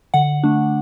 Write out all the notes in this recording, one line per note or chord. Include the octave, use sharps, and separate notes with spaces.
D3 F#5
A3 D4